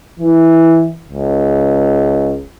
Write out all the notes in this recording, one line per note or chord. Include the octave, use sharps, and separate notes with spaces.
E3
C#2